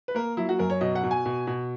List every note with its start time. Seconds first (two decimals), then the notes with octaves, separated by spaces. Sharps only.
0.08 B4
0.15 A#3 A#4
0.37 F#3 E4
0.49 F#4
0.59 F#2 A#4
0.70 C#5
0.81 B2 D#5
0.95 F#5
1.03 B2
1.11 G#5
1.26 B2
1.47 B2